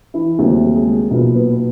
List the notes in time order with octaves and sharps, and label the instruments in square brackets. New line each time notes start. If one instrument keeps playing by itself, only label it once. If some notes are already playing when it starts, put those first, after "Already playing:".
[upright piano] E3 E4
D#2 C#3 F#3 G3 A3 C4 G4
G#3 G#4
B1 A#2 F#3 A#3 B3 A#4
B3 B4